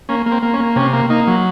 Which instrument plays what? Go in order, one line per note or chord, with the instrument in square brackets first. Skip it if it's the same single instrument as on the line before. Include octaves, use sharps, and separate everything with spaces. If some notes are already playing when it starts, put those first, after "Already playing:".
[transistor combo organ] A#3 C#4
A#3
C4
A#3
C#4
A#3
C3 C#4
A#3
A#3 D#4
F#3